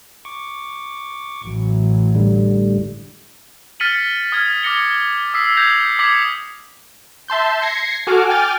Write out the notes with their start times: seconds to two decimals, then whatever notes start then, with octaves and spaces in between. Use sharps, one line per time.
0.25 C#6 D6
1.42 A1 E3 F#3
2.15 A2 D3 G3
3.80 F6 A6 B6 C#7 D#7 F#7
4.32 D#6 F6 G#6
4.63 D6 F6 A#6 C#7 G7
5.34 D#6 E6 B6 C7
5.57 G6 G#6 A#6 C7 F7
5.99 D6 D#6 G#6 B6 C#7 F#7
7.28 E5 A5 C6 G6
7.62 G#6 A#6 C7 C#7
8.07 F#4 A4 G#5 D6 F6
8.29 G5 G#5 D6 F6 A6